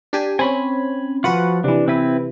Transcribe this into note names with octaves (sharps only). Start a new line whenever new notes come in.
D4 G4 G#5
C4 C#4 G#5 B5
F3 F4 F#4 B4 F#5
C3 E3 D4
C4 E4 B4